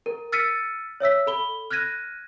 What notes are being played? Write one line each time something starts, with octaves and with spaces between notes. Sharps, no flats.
A#4
E6 F6 A6 B6 C#7 D#7
C#5 E5 E6 B6
A4 B5 G7
F6 F#6 G#6 A#6 D#7